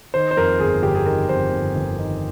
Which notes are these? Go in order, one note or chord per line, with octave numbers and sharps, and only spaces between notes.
D#3 C5
C5
F2 A#4
G1 G#4
G1 G4
G#4
D#3 A#4
F2 C5
G1
G1
D#3